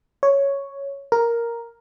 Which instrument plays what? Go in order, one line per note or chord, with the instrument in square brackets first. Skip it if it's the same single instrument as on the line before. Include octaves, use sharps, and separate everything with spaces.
[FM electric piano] C#5
A#4